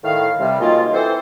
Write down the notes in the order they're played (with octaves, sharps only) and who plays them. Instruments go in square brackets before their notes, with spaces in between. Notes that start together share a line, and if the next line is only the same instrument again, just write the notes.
[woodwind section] A2 D#3 F5
C3 G3
D#3 F#3 G#3 A#3 F4
E3 B3 C4 A4 C5